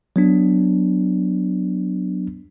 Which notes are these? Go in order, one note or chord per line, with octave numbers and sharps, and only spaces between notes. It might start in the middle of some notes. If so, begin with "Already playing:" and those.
F#3 B3 D4